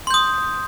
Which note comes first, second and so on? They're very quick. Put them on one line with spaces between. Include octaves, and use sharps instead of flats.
C6 G6 D#6